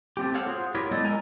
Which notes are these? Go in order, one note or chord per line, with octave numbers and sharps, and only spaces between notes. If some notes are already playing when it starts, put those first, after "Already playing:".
A3 C4 G4
A4 C5 C#5 F5 F#5
F4 F#4 G#4 C5
E4 F4 G4 A#4 C#5
G#3 A3 B3 A4 D5 D#5
A4 A#4 C#5 G#5 A#5